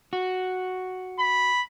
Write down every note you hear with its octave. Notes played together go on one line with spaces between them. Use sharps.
F#4
B5